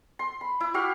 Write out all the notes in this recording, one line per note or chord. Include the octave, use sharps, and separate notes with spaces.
C6
B5
E4
F#4 G4 F5 C#6